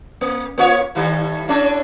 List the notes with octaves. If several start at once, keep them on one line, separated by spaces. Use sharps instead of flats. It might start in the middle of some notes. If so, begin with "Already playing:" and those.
A#3
A#3 F4 C#5
A2 D#3 G3
A2 C#4 D4